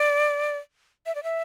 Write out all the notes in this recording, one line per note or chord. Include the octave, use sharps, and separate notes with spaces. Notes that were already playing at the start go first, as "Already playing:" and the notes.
Already playing: D5
E5
D5
E5